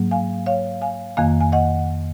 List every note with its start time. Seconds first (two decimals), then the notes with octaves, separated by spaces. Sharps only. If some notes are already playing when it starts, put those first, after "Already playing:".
Already playing: G#2 F#3 A#3
0.11 F5 G#5
0.46 C#5 F5
0.82 F5 G#5
1.17 F2 D#3 A#3 F5 G#5
1.41 G#5
1.52 D#5 F#5